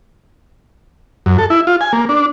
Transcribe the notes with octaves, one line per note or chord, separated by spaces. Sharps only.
F#2
A4
E4
F4
G#5
A#3
D4